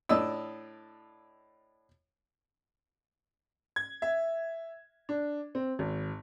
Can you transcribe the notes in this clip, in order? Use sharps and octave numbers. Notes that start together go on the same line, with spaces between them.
A2 D4 D#5 E6
G#6
E5
D4
C4
G#1